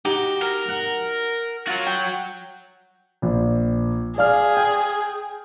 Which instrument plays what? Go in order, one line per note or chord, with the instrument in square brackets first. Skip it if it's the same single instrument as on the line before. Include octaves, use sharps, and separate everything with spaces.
[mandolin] D#4 F#4 [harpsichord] G4
[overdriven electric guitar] A#4
[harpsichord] F#5
[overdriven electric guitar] F#3 F#4 [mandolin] F4
[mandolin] G5
[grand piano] A#1
[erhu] G#4 [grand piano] D5 F5 F6
[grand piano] G5